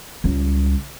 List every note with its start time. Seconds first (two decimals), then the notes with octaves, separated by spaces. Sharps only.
0.24 C#2 G3